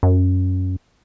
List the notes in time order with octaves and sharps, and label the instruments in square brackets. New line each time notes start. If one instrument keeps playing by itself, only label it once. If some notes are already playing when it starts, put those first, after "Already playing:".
[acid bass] F#2